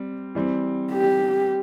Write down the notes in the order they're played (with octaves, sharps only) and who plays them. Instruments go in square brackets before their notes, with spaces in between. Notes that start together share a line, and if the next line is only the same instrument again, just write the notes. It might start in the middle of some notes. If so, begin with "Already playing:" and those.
Already playing: [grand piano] G3 C4
E3 G3 C4
[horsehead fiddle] G4